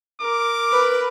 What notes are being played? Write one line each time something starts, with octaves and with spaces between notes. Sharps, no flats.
A#4 D6
B4